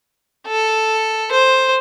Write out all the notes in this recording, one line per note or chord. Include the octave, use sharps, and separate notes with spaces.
A4
C5